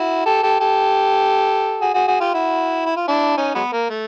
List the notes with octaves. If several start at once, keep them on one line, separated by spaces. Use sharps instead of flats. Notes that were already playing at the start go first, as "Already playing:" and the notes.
Already playing: E4 F#4
G4 A4
G4 A4
G4 A4
F#4 G#4
F#4 G#4
F#4 G#4
F4 G4
E4 F#4
E4
F4
D4 E4
C#4 D#4
F#3 G#3 B3
A#3
A3